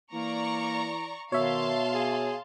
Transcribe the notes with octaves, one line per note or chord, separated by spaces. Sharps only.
E3 A#3 D5 A#5 C#6
B2 D#3 C#5 E5 F5 A5 C6
G#4